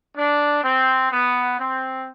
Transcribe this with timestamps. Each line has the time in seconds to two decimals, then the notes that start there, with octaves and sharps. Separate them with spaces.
0.16 D4
0.63 C4
1.11 B3
1.58 C4